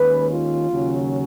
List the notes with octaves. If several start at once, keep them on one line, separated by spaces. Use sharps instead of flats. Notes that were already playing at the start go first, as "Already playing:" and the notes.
Already playing: D#2 D#3 G#3 C#4 B4
F4
D#2 C#3 F#3 C#4